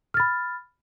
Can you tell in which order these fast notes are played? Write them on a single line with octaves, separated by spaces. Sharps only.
F6 A6 B5